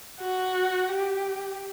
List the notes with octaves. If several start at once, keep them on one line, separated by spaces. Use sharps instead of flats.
F#4
G4